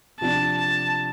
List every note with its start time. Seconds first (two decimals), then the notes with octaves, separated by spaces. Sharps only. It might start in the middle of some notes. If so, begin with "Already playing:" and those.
0.21 C3 F3 D4 A5
0.58 A5